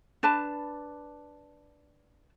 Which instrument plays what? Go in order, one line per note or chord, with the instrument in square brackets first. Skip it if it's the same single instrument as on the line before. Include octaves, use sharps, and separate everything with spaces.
[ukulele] D4 B4 A5